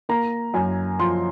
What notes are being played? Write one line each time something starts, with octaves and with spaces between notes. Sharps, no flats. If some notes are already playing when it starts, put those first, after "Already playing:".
A#3 A#5
F#2 G#5
F3 C6